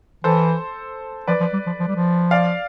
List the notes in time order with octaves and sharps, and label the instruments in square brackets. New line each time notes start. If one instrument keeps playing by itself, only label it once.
[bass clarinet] E3 [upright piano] A4 C5
[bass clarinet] F3 [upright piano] B4 D5
[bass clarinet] F3
G3
F3
F3
G3
F3
[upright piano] D5 F5